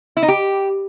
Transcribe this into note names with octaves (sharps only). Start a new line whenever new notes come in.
E4
D#4
G4